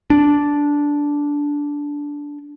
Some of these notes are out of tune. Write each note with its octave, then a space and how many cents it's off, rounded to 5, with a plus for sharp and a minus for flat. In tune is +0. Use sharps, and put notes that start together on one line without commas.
D4 -10